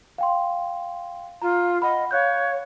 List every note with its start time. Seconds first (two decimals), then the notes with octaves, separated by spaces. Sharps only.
0.18 F5 G5 C6
1.42 F4 A#5
1.82 D#5 F#5 B5
2.11 C#5 F5 F#6 G6